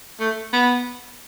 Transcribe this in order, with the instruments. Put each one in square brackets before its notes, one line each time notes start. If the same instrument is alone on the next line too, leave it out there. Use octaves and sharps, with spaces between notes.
[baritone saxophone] A3
B3